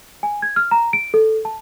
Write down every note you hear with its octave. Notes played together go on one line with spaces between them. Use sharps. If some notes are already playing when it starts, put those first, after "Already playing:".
G#5
G#6
F6
A#5
D7
A4
A5